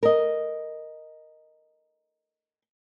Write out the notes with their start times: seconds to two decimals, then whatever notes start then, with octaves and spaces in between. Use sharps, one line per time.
0.03 A#4 D#5